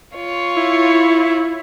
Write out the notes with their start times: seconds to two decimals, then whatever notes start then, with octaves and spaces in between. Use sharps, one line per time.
0.16 F4 C#5
0.57 E4